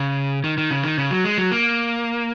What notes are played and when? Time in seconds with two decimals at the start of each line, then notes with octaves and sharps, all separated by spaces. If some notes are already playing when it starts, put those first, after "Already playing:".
Already playing: C#3
0.44 D#3
0.58 D#3
0.71 C#3
0.84 D#3
0.98 C#3
1.11 F#3
1.24 G#3
1.38 F#3
1.52 A#3